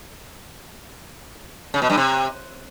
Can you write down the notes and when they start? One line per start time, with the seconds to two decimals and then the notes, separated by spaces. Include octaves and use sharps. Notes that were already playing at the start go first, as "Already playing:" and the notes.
1.74 C#3
1.82 B2
1.90 G2
1.97 C3